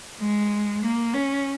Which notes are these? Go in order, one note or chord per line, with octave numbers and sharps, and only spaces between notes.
G#3
A#3
C#4